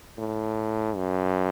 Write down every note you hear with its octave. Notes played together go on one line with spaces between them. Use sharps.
A2
F#2